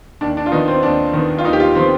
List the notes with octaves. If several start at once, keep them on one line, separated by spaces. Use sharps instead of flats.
D#2 D4
D4
F4
D#3 B3 D#4
C4
D#2 D4
D#3 B3
F4
D#2 D#4
G4
F4
D#3 B3 C4